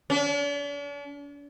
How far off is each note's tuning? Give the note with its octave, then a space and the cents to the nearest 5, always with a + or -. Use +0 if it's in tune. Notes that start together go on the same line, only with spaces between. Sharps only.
D4 -45